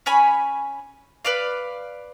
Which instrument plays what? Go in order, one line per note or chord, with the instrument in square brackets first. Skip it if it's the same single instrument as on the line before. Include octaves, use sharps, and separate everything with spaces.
[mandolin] C#4 C#5 G#5 B5
B4 D5 F5